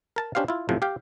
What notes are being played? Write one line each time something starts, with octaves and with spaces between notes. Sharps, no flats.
A#4 A5 A#5
C#4 D4 G4 C5 F5
E4 F4
B1 A2 C3 F3
G4 F5 G5